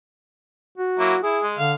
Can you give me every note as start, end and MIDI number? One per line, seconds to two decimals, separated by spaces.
0.77 1.22 66
0.99 1.15 54
0.99 1.15 58
0.99 1.15 64
1.23 1.39 64
1.23 1.48 68
1.43 1.57 56
1.58 1.74 50
1.58 1.72 77